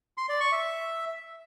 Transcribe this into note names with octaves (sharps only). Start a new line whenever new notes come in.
C6
D5
C#6
E5